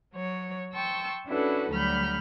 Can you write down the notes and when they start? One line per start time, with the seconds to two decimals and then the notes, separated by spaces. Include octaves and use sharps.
0.14 F#3 C#5
0.74 G5 A5 C6 C#6 E6
1.27 C#4 D4 E4 F#4 A4 B4
1.71 D2 F#3 G3 B5 F6 G6